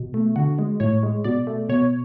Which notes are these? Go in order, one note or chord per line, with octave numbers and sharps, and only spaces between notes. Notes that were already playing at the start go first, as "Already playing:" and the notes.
Already playing: B2
A3
D3 F#4
G#3
A2 C#5
G#3
B2 D5
A3
B2 C#5